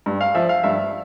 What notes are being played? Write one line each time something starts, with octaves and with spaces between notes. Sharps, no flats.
G2
F5
F3 E5
F5
G2 E5